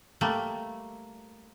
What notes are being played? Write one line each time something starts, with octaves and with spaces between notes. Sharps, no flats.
G3 A3 A#3